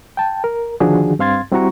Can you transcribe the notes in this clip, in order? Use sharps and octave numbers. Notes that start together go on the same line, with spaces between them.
G5 A5
A#4
D3 D#3 F3 D4 F#4 G#4
G2 C4 F5 C6 G#6 A6
G3 C4 E4 F#4 A#5 C#6